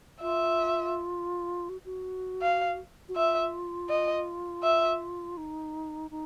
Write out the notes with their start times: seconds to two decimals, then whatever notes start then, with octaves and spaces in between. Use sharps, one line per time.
0.21 F4 E5
1.69 F#4
1.85 F#4
2.42 F5
3.09 F#4
3.16 F4 E5
3.90 D#5
4.63 E5
5.37 D#4
6.11 D#4